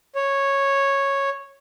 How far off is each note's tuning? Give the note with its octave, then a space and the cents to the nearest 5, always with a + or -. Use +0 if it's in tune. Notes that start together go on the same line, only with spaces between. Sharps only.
C#5 -10